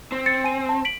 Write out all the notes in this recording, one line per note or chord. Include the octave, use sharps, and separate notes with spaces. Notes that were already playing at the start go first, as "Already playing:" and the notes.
C4
A6 C#7
G#5 D#7
A5
B6 D7 F#7